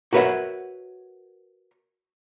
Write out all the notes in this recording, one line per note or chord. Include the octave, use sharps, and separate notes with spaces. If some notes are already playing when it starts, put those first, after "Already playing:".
F#4 A#4 B4 C#5 E5 F#5